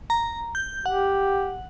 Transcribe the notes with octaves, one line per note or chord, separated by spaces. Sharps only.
A#5
G6
G4 F#5